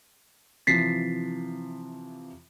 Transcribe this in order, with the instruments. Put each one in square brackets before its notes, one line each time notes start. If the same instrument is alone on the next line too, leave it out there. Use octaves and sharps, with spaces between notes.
[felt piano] C3 E3 F3 [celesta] A6 B6 C7